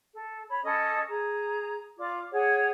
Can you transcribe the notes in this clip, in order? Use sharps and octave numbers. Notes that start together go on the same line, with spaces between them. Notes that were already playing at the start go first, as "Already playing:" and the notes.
A4
C#5 B5
C#4 A4 D#5 D#6
G#4 A#5
F4 D5 D6
G#4 C#5 F#5